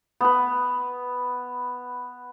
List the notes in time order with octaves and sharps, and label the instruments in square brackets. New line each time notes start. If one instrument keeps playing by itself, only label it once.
[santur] B3 B4